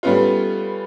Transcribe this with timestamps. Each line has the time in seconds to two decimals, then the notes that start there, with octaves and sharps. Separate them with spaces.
0.03 G3 A3 B3 C#4 F4